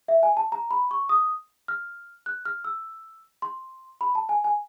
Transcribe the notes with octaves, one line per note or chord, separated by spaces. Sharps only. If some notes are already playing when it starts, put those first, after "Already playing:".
E5
G#5
A5
A#5
B5
C#6
D#6
F6
F#6
F6
E6
C6
B5
A5
G#5
G#5